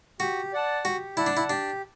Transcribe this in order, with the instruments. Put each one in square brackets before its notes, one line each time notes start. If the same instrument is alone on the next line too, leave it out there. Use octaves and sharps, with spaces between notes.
[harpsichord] F#4 [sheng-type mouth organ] G4
[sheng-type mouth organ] D5 F#5 A5
[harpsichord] F#4 [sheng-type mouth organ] G4
[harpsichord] E4 [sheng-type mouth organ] D5 F#5 A5
[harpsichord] D4
E4
[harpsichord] D4 [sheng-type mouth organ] G4